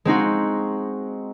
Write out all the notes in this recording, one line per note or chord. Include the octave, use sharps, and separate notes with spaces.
G#3 C4 D#4 F#4